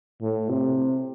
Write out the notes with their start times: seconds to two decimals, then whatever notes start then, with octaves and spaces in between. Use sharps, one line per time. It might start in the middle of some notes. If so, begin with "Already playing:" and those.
0.22 A2
0.50 C3